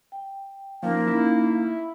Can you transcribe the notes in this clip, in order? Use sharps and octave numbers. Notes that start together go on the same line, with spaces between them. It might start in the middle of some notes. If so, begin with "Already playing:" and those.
G5
F3 A#3 C#4 D#4 F5
E4